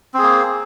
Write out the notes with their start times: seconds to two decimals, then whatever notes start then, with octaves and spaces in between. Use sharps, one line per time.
0.14 C4
0.18 G#4
0.23 A#3